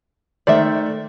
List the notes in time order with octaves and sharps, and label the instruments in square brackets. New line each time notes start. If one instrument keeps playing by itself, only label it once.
[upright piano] D#3 A3 C5 [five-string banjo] D5 E5